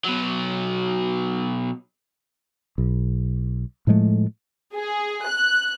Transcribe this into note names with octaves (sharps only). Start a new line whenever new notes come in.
B2 F#3
B1
A2 F3 G#3 A3
G#4
F#6